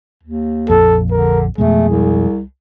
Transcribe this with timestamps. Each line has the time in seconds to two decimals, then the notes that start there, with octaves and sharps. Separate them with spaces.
0.23 D#2
0.70 A#1 F2 A4
1.11 D3 A#4
1.58 F2 B2 G#3 A3 G#4
1.89 C2